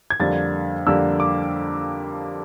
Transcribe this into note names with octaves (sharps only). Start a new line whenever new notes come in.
G#6
F2 D3 G3 A#3 A6
F2 D3 G3 A#3 E6
D6